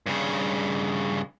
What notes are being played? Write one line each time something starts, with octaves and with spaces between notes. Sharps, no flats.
G2 C#3